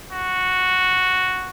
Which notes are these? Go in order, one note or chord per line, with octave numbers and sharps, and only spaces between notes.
F#4